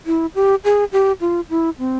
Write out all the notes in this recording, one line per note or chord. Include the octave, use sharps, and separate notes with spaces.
E4
G4
G#4
G4
F4
E4
C4